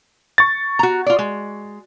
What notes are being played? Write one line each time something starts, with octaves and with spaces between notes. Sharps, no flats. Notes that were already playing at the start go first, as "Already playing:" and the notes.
C#6 A6
F#4 A#5
F4 D5
G#3